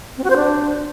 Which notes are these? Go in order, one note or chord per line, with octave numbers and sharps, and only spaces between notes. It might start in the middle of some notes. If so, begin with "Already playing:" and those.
C4
F#4
C5
D4